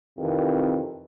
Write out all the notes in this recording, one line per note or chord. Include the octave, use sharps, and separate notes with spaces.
F2 C3 D#3 E3